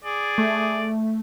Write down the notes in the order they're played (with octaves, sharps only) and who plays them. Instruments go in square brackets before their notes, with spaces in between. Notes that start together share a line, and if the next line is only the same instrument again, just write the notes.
[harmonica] G#4 D5
[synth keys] A3